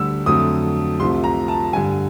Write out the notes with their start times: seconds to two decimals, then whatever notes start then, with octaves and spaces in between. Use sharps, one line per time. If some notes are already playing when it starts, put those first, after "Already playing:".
Already playing: D2 D3 G3 E6
0.26 F2 D3 F#3 A3 D#6
1.00 C2 C3 F3 A3 C6
1.24 A#5
1.48 A5
1.73 G2 D3 G3 G#5